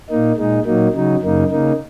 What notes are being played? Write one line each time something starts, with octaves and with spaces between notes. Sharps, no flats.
A#2 A#3 D#4
A#2 G#3 D#4
A#2 F#3 A#3 D#4
C#3 F#3 D#4
F#2 C#3 A#3 D#4
C#3 A#3 D#4